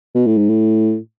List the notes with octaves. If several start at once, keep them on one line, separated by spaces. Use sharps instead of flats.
B2
A2
G#2
A2